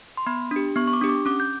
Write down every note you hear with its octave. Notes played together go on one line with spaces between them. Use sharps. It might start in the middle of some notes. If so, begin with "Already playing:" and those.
C6
B3 B5
D4 G4
B3 C#6
C#6
D6
D4 G4
D6
C#4 D6
G6